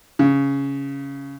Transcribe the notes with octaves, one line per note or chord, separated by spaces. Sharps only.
C#3